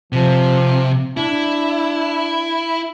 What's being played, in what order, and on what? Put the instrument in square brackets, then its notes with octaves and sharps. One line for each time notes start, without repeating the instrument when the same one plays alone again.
[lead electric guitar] C3 [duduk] F3
[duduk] D4 [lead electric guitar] E4